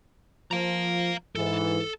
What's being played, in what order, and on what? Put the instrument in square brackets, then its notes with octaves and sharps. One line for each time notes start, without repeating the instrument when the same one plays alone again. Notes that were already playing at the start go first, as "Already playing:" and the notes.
[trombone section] F3 [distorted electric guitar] F5 A#5
[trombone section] G#2 E3 [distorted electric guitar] A4